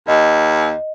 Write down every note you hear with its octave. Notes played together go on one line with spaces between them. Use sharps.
D#2 D#5